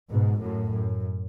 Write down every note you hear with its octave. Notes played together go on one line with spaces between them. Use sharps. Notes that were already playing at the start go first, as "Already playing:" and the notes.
G#2 B2
F#2 A2
F#2